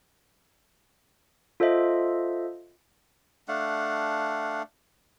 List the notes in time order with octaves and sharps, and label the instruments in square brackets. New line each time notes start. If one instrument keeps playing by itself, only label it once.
[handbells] F4 A4 C5 D#5 E5
[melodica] A3 D4 F5 F#5